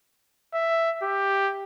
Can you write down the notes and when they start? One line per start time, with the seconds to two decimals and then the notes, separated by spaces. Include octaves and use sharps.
0.54 E5
1.02 G4